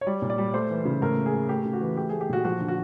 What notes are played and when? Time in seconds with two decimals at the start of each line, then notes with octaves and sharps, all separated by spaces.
0.01 C#5
0.07 G3 D5
0.22 A#2
0.30 D5
0.38 G3
0.54 A3 C5
0.70 E3
0.85 C#3
1.02 A2 A#4
1.18 A#3
1.26 G#4
1.34 A2
1.49 A3 G4
1.65 C#3
1.73 F#4
1.81 E3
1.97 A3 G4
2.09 A3 G#4
2.21 G4
2.29 A#2 F#4
2.45 F3 F#4
2.61 D3
2.68 F#4